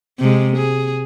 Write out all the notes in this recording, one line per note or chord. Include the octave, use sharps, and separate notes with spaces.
C3 G#3
G#4